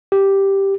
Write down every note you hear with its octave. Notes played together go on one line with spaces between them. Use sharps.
G4